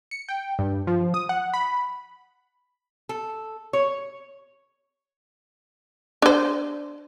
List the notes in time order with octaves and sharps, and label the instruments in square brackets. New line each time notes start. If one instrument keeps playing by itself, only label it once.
[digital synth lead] C#7
G5
G2
F3
D#6
F#5
B5
[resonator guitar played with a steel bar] A4
C#5
[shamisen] D4 C5